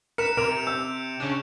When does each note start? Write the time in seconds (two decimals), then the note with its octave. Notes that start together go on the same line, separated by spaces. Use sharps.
0.18 A#4 B4 C#7 E7
0.37 C3 A#4 D7 F7
0.67 E6 G6
1.20 C#3 C#4 D4